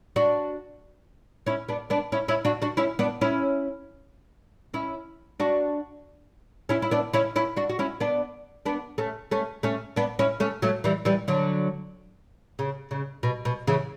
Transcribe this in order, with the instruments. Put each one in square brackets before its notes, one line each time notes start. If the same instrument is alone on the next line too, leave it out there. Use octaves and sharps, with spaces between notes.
[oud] D4 F#4
C#4 E4
B3 D4
B3 D4
C#4 E4
C#4 E4
D4 F#4
D4 F#4
C#4 E4
B3 D4
C#4 E4
C#4 E4
D4 F#4
C#4 E4
E4
B3 D4
C#4 E4
C#4 E4
D4 F#4
F#4
C#4 E4
B3 D4
B3 D4
A3 C#4
A3 C#4
A3 C#4
B3 D4
C#4 E4
A3 C#4
F#3 A3
E3 G3
E3 G3
D3 F#3
C#3
C#3
B2
B2
C#3 E3